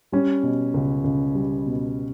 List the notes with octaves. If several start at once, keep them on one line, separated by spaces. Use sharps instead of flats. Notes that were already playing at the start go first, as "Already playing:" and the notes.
G3 C#4
B2
C#2
C#2
G3
B2